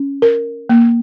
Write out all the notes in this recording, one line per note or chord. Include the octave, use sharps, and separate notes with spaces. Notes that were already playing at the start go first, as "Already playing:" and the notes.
Already playing: C#4
A#4
A#3